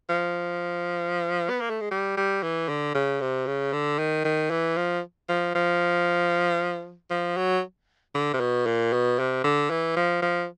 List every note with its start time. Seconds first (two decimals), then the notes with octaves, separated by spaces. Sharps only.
0.10 F3
1.50 B3
1.61 A#3
1.70 A3
1.81 G#3
1.91 G3
2.17 G3
2.43 E3
2.69 D3
2.95 C#3
3.21 C3
3.47 C#3
3.73 D3
3.99 D#3
4.25 D#3
4.51 E3
4.77 F3
5.29 F3
5.55 F3
7.11 F3
7.37 F#3
8.15 D3
8.34 C3
8.40 B2
8.67 A#2
8.93 B2
9.19 C3
9.44 D3
9.70 E3
9.96 F3
10.22 F3